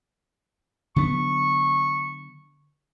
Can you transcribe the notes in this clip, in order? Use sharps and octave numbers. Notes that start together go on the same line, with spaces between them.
D3 F#3 B3 C#6